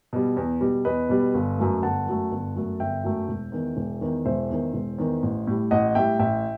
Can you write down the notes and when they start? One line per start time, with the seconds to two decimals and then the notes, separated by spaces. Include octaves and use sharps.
0.13 B2 G3
0.37 E2
0.61 B2 G3
0.85 E2 B4 D#5
1.09 B2 G3
1.34 G1
1.58 F#2 F#3 A3
1.82 G1 F#5 A5
2.06 F#2 F#3 A3
2.31 G1
2.56 F#2 F#3 A3
2.80 G1 E5 G5
3.04 F#2 F#3 A3
3.28 E1
3.52 E2 D#3
3.77 E1
4.01 E2 D#3
4.25 E1 C5 E5
4.50 E2 D#3
4.74 E1
4.98 E2 D#3
5.23 A1
5.47 A2 G3
5.71 A1 D#5 F#5
5.95 A2 G3 E5 G5
6.19 A1 E5 G5